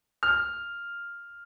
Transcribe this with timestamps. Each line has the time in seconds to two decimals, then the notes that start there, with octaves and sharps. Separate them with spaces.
0.23 F6